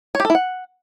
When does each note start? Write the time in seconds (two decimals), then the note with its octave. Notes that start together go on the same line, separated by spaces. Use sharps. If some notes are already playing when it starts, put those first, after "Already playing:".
0.15 C#5
0.20 G4
0.25 A4
0.30 E4
0.35 F#5